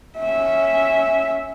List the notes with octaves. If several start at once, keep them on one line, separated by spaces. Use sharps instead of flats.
C#4 E5